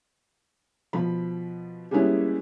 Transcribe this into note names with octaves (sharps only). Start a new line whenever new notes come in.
B2 F3 B5
G3 G#3 A#3 B3 C#4 E4